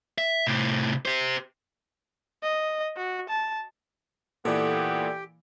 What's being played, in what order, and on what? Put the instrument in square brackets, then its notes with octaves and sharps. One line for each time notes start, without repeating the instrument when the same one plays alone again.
[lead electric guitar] E5
A2 C3
G4 C5
[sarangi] D#5
F#4
A5
[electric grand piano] A#2 E3 [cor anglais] B3 [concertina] G4 G5 [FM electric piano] A4 D5